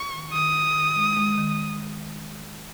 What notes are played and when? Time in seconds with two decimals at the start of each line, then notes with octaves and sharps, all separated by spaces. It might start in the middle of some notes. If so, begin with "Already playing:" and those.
Already playing: C#6
0.13 D#3
0.33 D#3 D#6
0.54 D#3
0.75 D#3
0.96 G#3
1.17 G#3
1.37 D#3